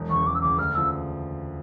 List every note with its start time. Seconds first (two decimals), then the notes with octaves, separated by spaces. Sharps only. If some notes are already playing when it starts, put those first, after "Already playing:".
Already playing: E1
0.09 E2 C#3 C#6
0.26 E1 D6
0.35 E6
0.41 E2 C#3 D6
0.58 D2 F6
0.74 C#3 F3 E6